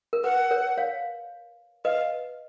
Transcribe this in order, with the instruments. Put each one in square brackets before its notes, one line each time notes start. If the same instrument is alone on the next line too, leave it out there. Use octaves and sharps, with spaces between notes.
[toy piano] A#4
[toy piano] B4 [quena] F#5
[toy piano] A#4 C#5
C#5 F5
[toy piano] B4 D#5 [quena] F5